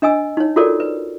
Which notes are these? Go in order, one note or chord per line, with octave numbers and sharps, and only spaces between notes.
D4 D#5 G#5 E6
D#4 C#5
F4 F#4 A4 A#4 C#5 D5
B4